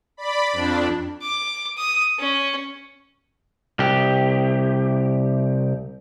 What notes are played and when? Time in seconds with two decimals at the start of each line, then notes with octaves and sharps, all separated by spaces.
0.17 D5 B5
0.52 F2 D4
1.22 D6
1.77 D#6
2.19 C#4
3.79 C2 G4